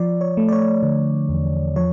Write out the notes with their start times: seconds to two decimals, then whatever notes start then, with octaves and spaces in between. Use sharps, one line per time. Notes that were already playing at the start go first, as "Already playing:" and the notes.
Already playing: F3 D5
0.21 C#5
0.37 A3
0.48 D5
0.52 C#5
0.83 D3
1.29 E2
1.76 F3 C#5